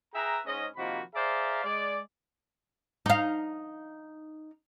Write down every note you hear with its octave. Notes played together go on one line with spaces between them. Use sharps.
G#4 B4 E5 G5 A#5
G#2 C#4 D#5
C3 D#3 F3 A#3 F#4 B5
G#4 C5 D5 E5 F5 A#5
G#3 D5
D#4 F5